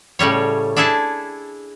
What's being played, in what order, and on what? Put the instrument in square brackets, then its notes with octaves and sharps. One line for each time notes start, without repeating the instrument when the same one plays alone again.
[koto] A2 C#3 G3 C#5
D4 E4 G#4 A4 A5